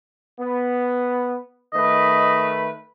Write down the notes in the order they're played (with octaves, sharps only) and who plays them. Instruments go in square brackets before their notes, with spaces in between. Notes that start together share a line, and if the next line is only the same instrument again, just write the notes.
[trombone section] B3
[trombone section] D#3 A3 B4 [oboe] D#5